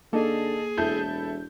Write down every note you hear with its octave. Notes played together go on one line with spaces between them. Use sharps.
D3 A#3 D#4 G#4 A4
E1 E4 A4 G6